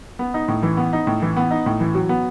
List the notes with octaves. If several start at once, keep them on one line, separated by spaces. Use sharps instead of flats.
B3
D#4
A2
E3
B3
D#4
A2
E3
B3
D#4
A2
E3
F#3
B3